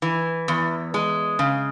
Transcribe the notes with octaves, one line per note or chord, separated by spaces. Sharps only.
E3
E2
G#3
C#3